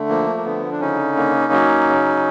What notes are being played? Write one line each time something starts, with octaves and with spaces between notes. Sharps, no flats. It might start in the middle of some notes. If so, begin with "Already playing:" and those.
Already playing: D3 A3
F3 A#3
A#3
D3 B3
D4
C#3 C#4 D#4
A#3
F#3
C#3